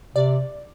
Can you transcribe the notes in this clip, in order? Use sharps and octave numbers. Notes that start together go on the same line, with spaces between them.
C3 D5